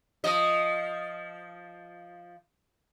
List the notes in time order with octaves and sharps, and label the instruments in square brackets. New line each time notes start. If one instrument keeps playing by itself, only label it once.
[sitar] F3 D#5